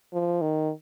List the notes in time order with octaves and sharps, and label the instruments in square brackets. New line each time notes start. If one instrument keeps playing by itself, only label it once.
[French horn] F3
D#3